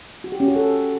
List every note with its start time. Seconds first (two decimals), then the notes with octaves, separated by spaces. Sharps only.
0.24 F#4
0.32 G4
0.40 C#4
0.48 F#4
0.56 A4